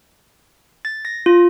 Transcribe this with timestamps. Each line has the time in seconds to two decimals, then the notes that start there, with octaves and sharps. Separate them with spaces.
0.85 A6
1.05 A#6
1.26 F4